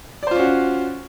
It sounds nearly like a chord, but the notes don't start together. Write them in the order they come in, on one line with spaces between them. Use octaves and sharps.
D5 C5 F4 C#4 F#4